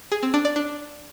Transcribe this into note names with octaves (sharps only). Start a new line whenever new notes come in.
G#4
C4
D4
D5
D4